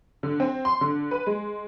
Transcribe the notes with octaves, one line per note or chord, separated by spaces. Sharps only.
D3
C4
C6
D3
B4
G#3